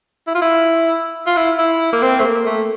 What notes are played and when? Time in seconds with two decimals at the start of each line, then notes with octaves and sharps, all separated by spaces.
0.27 E4
0.35 F4
0.42 E4
1.26 F4
1.37 E4
1.58 E4
1.93 A#3
2.03 C4
2.20 A3
2.24 A#3
2.46 A3